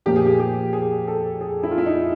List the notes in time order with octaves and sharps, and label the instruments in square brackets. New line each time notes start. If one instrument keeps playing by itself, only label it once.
[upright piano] A#2 F3 A#3 G4
G#4
G4
G4
G#4
A4
G#4
E4
F4
E4
D#4